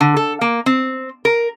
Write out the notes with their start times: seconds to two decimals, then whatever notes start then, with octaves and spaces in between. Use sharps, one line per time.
0.01 D3
0.17 A4
0.41 A#3
0.66 C4
1.25 A#4